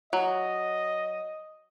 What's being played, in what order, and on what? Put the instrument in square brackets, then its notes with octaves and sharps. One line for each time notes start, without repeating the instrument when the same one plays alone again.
[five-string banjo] F#3 [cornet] D#5